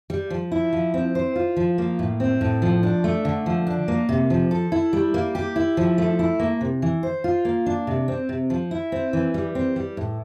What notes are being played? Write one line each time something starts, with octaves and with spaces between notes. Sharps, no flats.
G3
F3
E4
F3
C4
C5
F4
F3
A#3
A2
C4
A2
F3
D4
A3
D3
F3
D4
A#3
C3
F3
A4
E4
G3
A#3
G4
E4
F3
A3
E4
A#3
C3
E3
C5
F4
A#3
D4
C3
C4
C3
F3
E4
C4
E3
G3
C4
G3
A2